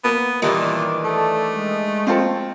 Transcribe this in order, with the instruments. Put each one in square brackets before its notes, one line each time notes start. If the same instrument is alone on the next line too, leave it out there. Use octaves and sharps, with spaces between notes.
[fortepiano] A#3 [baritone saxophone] B3
[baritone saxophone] A#2 [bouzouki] D#3 E3 D4 [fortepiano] G3
[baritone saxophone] A3 [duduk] A4
[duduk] G#3
[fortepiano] C4 F4 A4